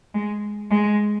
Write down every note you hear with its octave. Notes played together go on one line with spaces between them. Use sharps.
G#3
G#3